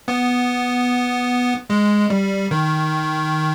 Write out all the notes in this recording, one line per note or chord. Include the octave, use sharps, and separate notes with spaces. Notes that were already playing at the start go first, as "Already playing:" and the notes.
B3
G#3
G3
D#3